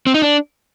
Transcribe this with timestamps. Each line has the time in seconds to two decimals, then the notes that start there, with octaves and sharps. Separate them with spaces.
0.07 C4
0.14 D#4
0.22 D4